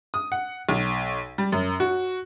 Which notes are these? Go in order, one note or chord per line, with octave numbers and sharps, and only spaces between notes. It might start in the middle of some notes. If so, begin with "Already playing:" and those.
D#6
F#5
B1
G3
F#2
F#4